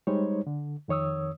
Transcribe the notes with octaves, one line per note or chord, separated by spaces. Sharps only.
G3 G#3 D#4 C5 C#5
D3
F2 D#3 C#5 D#6 E6